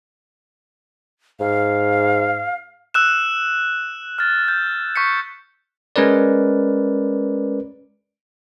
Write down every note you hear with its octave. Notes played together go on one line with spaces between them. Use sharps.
G#2 F5
E6 F#6 E7
F6 A6
G6
C#6 G6 B6 C#7
G#3 C#4 A#4 B4 D5